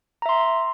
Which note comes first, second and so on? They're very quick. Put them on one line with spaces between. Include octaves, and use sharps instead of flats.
A#5 E5 C6